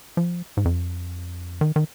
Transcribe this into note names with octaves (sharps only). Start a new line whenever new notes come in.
F3
G#2
F2
D#3
D#3